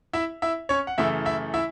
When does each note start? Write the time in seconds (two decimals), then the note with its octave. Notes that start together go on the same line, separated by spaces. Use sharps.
0.13 E4 E5
0.42 E4 E5
0.69 C#4 C#5
0.87 F#5
0.98 F#2 C#3 E3 A3 E4 E5
1.25 E4 E5
1.54 E4 E5